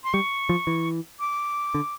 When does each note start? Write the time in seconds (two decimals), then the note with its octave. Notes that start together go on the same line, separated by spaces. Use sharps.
0.04 C6
0.14 G3 C#6
0.49 F3
0.67 E3
1.20 D6
1.74 D3